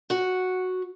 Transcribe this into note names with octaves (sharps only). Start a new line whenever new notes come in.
F#4 F#5